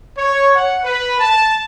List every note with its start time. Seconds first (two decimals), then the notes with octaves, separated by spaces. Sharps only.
0.18 C#5
0.55 F#5
0.85 B4
1.20 A5